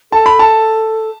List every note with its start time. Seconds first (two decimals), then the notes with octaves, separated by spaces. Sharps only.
0.12 A4 A5
0.26 B5
0.39 A5